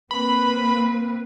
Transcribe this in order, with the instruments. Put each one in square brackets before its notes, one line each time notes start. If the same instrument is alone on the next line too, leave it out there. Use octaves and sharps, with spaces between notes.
[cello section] A#3 C4 B4 [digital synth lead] B5